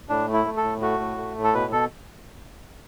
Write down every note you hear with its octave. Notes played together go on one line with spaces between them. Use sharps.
A2 D4
A3
E4
A3
A4
A2
A3 F#4
A2
A3
A2
A4
B2 B4
B2 A4